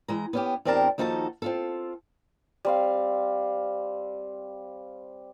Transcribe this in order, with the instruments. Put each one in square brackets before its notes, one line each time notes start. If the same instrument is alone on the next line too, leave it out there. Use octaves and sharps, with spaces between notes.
[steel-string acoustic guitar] E3 G#3 A#5
B3 C#4 G4
E2 C4 D4 G4 A#4 A5
D#2 F3 D#4 F#4 A4 A5
C4 F4 A4
[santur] G3 C4 F5